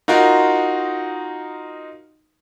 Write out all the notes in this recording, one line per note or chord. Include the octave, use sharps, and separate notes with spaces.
D#4 F4 F#4 A#4